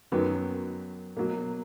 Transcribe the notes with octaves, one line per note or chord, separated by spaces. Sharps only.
F#2 D#3 F#3 B3
B2 F#3 A#3